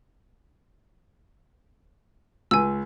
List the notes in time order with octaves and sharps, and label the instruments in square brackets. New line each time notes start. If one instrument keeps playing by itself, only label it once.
[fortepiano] C#2 [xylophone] G#5 E6